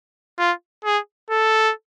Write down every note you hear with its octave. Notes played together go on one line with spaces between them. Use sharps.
F4
G#4
A4